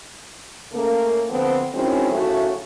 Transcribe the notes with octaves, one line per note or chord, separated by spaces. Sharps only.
C#3 A3 A#3
D2 D3 F3 B3 C4
D#3 F#3 G#3 C4 C#4 E4
D#2 C#3 F#3 A3 E4 F#4